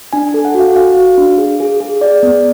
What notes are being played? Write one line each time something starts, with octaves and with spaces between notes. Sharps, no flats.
D4 G#5
G#5
A4
F#5
F#4
F5
F#4 F5
F#4
D4
G#4
G#4
G#4
G#4 D5
B3